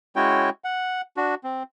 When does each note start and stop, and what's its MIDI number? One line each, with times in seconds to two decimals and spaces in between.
0.16 0.50 56
0.16 0.50 61
0.16 0.50 64
0.16 0.50 66
0.16 0.50 73
0.16 0.50 79
0.64 1.01 78
1.17 1.35 62
1.17 1.35 66
1.44 1.63 60